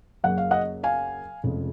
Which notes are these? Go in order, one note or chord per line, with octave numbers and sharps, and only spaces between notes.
F#2 C#3 F#3 A#3 F#5
F5
D#5 F#5
F5 G#5
F1 F2 C#3 G#3